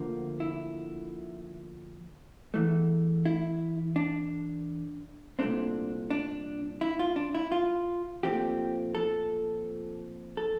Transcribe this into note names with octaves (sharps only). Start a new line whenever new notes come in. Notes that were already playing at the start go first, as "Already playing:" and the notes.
Already playing: D2 D3 F3 A#3
E4
E2 E3 A3
E4
D4
C2 A#2 A3 C4 D4
D4
E4
F4
D4
E4
F4
A#2 F3 A3 C4 G4
A4
A4